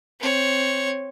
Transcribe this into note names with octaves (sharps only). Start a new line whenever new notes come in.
C4 C#5